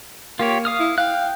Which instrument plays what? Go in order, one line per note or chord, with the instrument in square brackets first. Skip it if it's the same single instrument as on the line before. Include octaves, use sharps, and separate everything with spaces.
[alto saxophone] A#3 [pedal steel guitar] F4 G4 C#5
[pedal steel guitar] F5 D#6 F6
[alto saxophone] E4
[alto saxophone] F5 [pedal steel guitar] G5 F#6